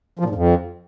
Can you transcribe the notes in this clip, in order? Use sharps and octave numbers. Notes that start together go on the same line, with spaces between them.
F3
A#2
G#2
F2